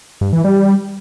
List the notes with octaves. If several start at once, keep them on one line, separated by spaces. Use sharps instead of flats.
G2
E3
G3